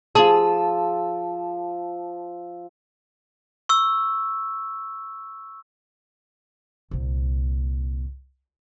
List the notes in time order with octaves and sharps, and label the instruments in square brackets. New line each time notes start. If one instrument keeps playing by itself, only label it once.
[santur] F3 E6 [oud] G#4 [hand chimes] A5
[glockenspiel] C#6 E6
[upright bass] C2 A#2